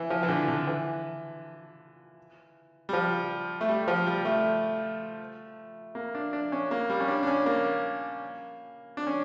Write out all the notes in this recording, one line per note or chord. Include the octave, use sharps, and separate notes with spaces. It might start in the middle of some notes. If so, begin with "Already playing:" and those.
Already playing: E3
F3
E3
D3
D3
E3
G3
F3
A3
G3
F3
G3
A3
A#3
D4
D4
C#4
A#3
G3
C#4
D4
D4
C#4
A#3
D4
C#4